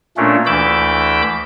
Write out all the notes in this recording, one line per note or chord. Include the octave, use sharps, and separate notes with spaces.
A#2 A3 A#3 C#4 D4
D2 E3 B5 D6 E6 G6